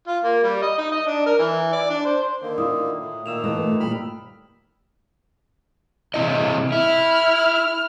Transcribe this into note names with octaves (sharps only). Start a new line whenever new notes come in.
F4
A#3
G3
D#5
D#4
D#5
D4
A#4
E3
D5
D4
C5
D3 D#3 A#3
E4 F4 D#6
A2
A#2 D#3 A#3 E6 E7 F7
E3 A3 D#5
D#2 A#2 G3 B5 F6
C3 E4 D#5
E4 F6